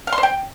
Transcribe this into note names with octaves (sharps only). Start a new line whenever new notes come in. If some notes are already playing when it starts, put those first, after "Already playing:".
F5
C6
C5
G5